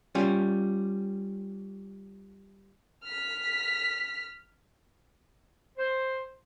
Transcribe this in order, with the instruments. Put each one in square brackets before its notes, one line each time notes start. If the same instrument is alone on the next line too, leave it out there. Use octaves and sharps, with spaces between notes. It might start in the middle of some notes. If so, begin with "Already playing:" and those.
[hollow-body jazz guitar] G3 C#4 F4
[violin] F6 B6
[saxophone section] C5